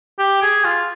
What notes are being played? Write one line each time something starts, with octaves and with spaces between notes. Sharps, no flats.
G4
G#4
F4